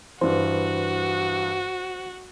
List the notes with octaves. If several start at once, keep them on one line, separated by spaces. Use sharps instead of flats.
G2 E3 F#4 C5